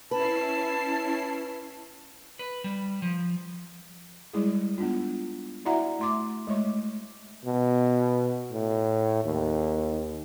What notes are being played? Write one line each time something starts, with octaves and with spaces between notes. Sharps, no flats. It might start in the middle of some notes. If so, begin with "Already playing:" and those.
C#4 E4 B4 A5 C7
B4
G3
F3
G3 G#3 E4 G#4
B3 D4 F4
E4 F#4 D5 E5 F#5 A#5
A3 C6 D6
G#3 A3 C#5 C#6
B2
A2
D#2